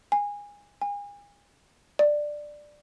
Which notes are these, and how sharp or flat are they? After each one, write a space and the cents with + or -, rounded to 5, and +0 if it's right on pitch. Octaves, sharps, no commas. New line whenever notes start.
G#5 -20
G#5 -35
D5 +10